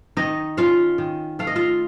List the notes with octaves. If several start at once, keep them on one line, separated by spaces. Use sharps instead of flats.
D#3 D#4 D#5
C#4 F4 F5
D#3
A3 F5
D#5
F4 F5